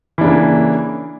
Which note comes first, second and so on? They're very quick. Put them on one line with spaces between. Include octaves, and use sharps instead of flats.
E3 D4 C#3 A#3